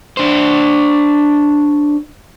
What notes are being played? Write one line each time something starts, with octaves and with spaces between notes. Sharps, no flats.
D4 C5